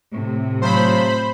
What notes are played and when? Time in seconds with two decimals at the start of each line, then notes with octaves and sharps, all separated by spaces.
0.14 A2 C3
0.62 F3 F#3 A3 C5 B5